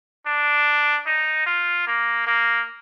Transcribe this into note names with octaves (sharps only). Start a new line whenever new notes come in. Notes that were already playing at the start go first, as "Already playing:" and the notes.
D4
D#4
F4
A#3
A#3